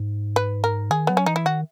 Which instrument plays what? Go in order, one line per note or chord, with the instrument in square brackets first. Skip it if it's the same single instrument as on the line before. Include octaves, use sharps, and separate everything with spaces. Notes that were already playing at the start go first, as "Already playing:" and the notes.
Already playing: [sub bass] G#2
[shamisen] B4
A#4
[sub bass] D#3 [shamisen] G#4
[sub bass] F#3 [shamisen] B3
[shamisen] C#4
[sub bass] E3 [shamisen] D#4
[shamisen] E4
[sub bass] D#3 [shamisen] F#4